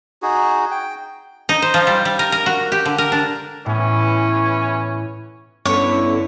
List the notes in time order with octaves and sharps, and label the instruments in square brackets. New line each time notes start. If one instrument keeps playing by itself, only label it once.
[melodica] D#4 F#4 G#4
G5
[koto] D#4
C5
F3
G3
G3
A#4
A#4
F#4
G4
D3
A#4
D4
[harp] A2 [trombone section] E3 B3 C#4
[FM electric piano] G2 C#7 [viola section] D3 E4 [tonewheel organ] B3 C#4 [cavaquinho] C#5